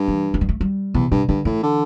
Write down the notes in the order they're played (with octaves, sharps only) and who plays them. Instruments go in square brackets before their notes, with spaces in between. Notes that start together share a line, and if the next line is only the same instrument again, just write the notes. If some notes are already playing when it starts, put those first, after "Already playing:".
Already playing: [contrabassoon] G2
[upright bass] E3
A3
G3
A3
G3
[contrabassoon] E2 [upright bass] C3
[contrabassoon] G2 [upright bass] C3
[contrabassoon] G2 [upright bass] D3
[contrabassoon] A2 [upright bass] E3
[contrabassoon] D3